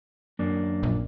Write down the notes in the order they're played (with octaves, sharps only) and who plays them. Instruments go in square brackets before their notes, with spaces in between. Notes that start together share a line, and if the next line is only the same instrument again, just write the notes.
[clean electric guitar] F#2 A#3 D4
[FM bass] A#1